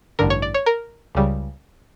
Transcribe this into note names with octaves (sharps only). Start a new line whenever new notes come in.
A1 G2 D3 A#4
C#5
D5
C#5
A#4
C#2 C#3 G3